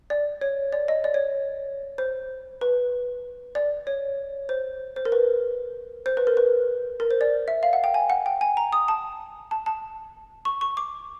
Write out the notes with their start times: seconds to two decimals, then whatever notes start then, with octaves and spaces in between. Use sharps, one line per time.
0.10 D5
0.41 C#5
0.72 D5
0.88 D#5
1.04 D5
1.14 C#5
1.98 C5
2.61 B4
3.55 D5
3.87 C#5
4.49 C5
4.96 C5
5.05 A#4
5.12 B4
6.06 C5
6.17 B4
6.27 A#4
6.37 B4
7.00 A#4
7.11 C5
7.21 D5
7.48 E5
7.63 F5
7.73 F#5
7.84 G5
7.94 G#5
8.10 F#5
8.26 G5
8.41 G#5
8.57 A#5
8.73 D#6
8.88 A5
9.51 A5
9.66 A5
10.45 C#6
10.61 C#6
10.77 D6